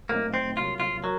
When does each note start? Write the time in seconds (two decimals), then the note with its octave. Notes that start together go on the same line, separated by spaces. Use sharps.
0.09 A#2 F#3 A3 A#3 C4 D#4
0.34 C4
0.57 C2 C3 F#3 A#3 F4
0.80 F4
1.03 F#3 A#4